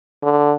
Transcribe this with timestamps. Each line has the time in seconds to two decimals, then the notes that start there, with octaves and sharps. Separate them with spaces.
0.23 D3